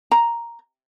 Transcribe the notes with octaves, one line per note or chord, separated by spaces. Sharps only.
A#5